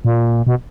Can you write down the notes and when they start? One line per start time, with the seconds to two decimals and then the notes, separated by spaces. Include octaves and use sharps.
0.05 A#2
0.47 B2